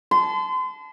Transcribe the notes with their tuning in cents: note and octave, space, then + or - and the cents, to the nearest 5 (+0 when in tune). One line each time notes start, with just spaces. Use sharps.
A5 -20 C6 -40